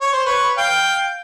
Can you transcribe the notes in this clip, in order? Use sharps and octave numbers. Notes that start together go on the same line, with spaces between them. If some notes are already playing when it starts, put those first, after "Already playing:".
C#5
C5
B4 C#5
F5 G5